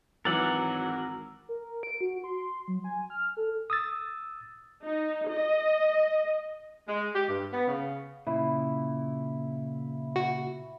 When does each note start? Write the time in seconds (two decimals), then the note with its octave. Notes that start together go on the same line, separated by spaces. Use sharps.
0.25 G#1 E3 F#3 A#4 F#5 D6 E6 A6
1.49 A#4
1.83 D7
2.01 F#4
2.24 C6
2.68 F#3
2.84 G#5
3.10 F6
3.37 A4
3.70 D#6 E6 A6
4.82 D#4
5.29 D#5
6.87 G#3
7.14 G4
7.28 G2
7.52 B3
7.68 C#3
8.27 A#2 C#3 E4
10.16 F#4